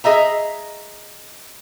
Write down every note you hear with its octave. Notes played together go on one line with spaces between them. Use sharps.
G#4 D#5 E5 A#5